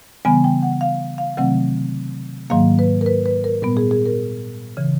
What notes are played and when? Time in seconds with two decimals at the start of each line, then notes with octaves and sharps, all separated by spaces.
0.25 C#3 E3 G3 B3 G#5
0.44 G5
0.62 F#5
0.81 F5
1.18 F5
1.37 C3 D#3 F#3 A3 C4 F#5
2.50 G#2 D#3 F#3 A#3 F5
2.79 B4
3.01 A#4
3.06 B4
3.26 B4
3.44 A#4
3.62 A#2 G3 B3 A#4
3.77 G#4
3.91 G#4
4.06 A#4
4.77 C#3 E3